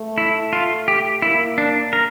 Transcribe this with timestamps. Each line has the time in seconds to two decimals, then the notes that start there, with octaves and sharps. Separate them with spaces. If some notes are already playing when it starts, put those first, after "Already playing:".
Already playing: A3
0.18 E4
0.53 F4
0.88 G4
1.22 A#3 E4
1.58 D4
1.93 A#4